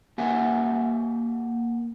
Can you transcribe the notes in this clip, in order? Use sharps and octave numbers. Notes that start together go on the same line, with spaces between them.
A#3 G4 E5 F#5 G#5